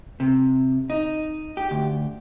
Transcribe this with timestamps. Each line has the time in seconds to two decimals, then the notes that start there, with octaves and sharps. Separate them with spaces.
0.20 C3
0.90 D#4
1.57 G4
1.71 D2